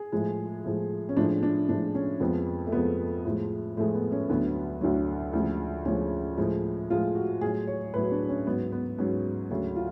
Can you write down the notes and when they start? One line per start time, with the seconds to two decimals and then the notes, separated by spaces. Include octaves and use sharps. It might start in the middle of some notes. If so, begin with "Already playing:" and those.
Already playing: G#4
0.12 A2 F3 G#3
0.64 A2 F3 G#3
1.09 C#4
1.16 A2 F3 G#3 D4
1.43 D4
1.69 A2 F3 G#3 D4
1.95 C#4
2.20 F2 F3 G#3 B3
2.67 A3
2.72 F2 F3 G#3 B3
3.26 A2 F3 G#3
3.77 A2 F3 G#3 A3
3.94 B3
4.12 C#4
4.29 D2 D3 F#3 B3
4.81 D2 D3 F#3
5.33 D2 C#3 F3 G#3
5.85 D2 C#3 F3 G#3 C#4
6.38 A2 F3 G#3
6.90 A2 F3 G#3 F4
7.15 F#4
7.41 A2 G#4
7.46 F#3
7.67 C#5
7.94 A2 F#3 B4
8.12 D4
8.29 C#4
8.47 G#2 F#3 B3
8.72 B3
8.98 G#2 F#3 C#4
9.51 D2 C#3 F#3
9.76 F4